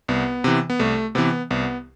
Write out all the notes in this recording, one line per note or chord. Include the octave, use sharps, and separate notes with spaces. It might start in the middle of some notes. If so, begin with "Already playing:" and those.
C2 B3
C3 E3
B3
C2 A3
C3 E3 B3
C2 B3